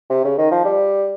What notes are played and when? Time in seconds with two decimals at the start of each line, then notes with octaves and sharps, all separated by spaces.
0.10 C3
0.24 C#3
0.38 D#3
0.51 F3
0.65 G3